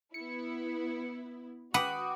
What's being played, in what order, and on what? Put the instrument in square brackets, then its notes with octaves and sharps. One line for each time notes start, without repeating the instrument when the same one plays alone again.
[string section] B3 E4 [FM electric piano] C#7
[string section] F#4 [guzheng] B4 F#5 [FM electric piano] G5 D6 D#6